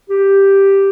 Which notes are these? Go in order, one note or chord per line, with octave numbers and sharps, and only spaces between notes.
G4